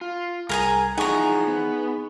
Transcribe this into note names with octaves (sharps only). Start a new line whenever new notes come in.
F4
C2 G#4 A#4 G#5 A#5
E3 F3 D#4 G#4 F#5 G#5 A#5 C#6
B3